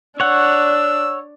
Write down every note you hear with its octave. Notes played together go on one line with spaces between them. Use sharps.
D4 C#5 F#5 E6